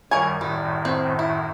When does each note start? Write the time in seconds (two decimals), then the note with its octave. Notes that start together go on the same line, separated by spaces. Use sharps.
0.11 F#2 D#3 G3 A#4 C#5 G#5
0.41 F#2 A2 D#3 G3
0.85 C4
1.19 E4